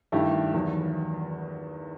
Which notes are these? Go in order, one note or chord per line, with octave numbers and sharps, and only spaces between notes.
G2 D#3 A3 E4 G4
E2 D#3 F#3